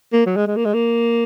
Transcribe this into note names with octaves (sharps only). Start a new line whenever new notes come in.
A#3
F#3
G#3
G#3
A#3
G#3
A#3